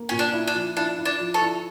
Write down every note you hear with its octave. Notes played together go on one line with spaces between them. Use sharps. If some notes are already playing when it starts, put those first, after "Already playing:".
Already playing: A#3
A#2 C#4
D4
E4
D4
F3
D4 E4
E4
D4
F3
A4 C#5
E4